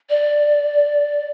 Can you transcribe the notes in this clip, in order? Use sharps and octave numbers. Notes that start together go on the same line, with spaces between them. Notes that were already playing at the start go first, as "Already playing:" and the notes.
D5